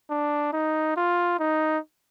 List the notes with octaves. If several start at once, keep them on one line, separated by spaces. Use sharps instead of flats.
D4
D#4
F4
D#4